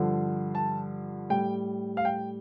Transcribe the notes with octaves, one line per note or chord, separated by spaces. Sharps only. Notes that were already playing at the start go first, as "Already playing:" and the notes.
Already playing: G2 D3 F3
A5
A2 G3 G5
F5
G5